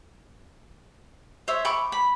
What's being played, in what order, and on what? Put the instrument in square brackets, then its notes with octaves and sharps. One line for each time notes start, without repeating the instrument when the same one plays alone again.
[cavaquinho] C5 C#5 E5
B5 C#6 D6
B5